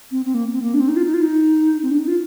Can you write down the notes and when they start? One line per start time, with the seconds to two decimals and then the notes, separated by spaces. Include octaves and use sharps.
0.12 C4
0.25 C4
0.34 A#3
0.53 C4
0.62 A#3
0.74 D4
0.80 C4
0.88 D#4
0.96 F4
1.05 D#4
1.14 F4
1.22 D#4
1.83 C4
1.91 D4
1.99 D#4
2.08 F4